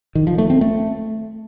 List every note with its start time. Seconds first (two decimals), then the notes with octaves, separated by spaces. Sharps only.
0.15 D#3
0.27 F3
0.38 A3
0.50 C4
0.61 A3